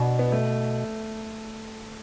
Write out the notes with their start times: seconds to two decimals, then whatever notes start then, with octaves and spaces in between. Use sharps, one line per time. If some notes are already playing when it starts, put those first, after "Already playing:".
Already playing: B2 D4
0.19 B3
0.32 A3